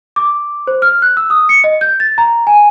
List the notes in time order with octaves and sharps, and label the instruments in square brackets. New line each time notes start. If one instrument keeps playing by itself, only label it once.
[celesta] D6
C5
F6
F#6
E6
D#6
C#7
D#5
G6
A6
A#5
G#5